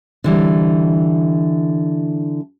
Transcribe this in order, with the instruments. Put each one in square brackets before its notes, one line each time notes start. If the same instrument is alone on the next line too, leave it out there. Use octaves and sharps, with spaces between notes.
[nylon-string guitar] D3 E3 G3